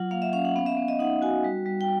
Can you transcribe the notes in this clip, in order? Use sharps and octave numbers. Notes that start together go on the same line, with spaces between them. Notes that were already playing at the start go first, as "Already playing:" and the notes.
Already playing: F#3 F4 F#5
A#3 F5
E5
C#4 F5
F#5
B3 F5
E5
B3
D#5
D#4 F#5
F#4 G#5
G3
G3
G5